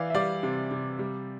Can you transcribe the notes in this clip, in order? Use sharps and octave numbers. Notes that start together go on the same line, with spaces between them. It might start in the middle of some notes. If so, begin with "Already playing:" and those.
Already playing: E3 D5 F5
E5
G3 D5 F5
C3
C3
G3